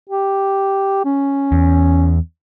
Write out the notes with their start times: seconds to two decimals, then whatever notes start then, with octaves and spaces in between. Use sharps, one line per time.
0.09 G4
1.05 C#4
1.52 E2